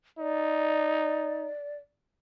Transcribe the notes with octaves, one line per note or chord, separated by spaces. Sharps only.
D#4 D5